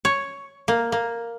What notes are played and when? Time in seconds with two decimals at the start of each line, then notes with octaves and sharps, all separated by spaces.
0.05 C#5
0.68 A#3
0.92 A#3